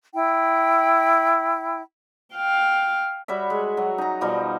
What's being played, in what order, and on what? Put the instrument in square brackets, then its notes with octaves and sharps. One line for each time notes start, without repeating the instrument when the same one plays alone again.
[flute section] E4 G5
[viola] F5 G5
[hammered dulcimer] G3 F#4 C#5 E5
G#3
F#3
D#4 A#5
B2 F3 G3 D#4